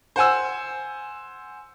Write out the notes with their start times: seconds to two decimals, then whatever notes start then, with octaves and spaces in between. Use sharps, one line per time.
0.16 C5 F#5 G#5 E6